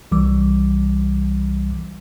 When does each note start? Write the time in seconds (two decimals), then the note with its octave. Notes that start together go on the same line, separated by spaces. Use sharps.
0.12 C2 E3 G3 D6